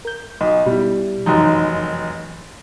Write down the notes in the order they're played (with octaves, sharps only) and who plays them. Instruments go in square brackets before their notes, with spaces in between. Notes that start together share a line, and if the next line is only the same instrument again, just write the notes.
[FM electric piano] A#4 G6
[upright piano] B1 [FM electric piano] D#5
[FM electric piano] B2 E4 [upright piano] G3
[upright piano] F1 F#2 D#4 [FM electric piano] E3